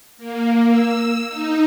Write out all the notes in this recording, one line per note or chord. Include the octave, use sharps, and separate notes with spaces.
A#3
E6
D#4